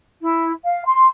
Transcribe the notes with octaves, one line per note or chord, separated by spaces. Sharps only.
E4
F5
C6